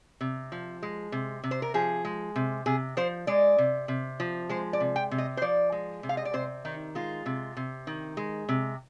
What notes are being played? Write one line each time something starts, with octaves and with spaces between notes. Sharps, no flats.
C3
F3
G#3
C3
C3
C5
A#4
F3 G#4
G#3
C3
C3 G#4
F3 C5
G#3 D5
C3
C3
F3
G#3 C5
D5
C3
G5
C3
D#5
C5
F3 D5
G#3
C3
F5
D#5
D5
C3 C5
D#3 D#4
G#3 F4
C3
C3
D#3
G#3
C3